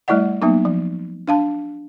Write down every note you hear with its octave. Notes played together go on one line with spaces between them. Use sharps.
G3 A3 E4 D5 D#5 F#5
F#3 A#3 B3 D#4
F3
D4 F5 A5